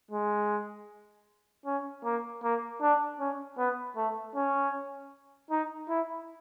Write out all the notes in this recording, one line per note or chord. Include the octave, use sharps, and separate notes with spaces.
G#3
C#4
A#3
A#3
D4
C#4
B3
A3
C#4
D#4
E4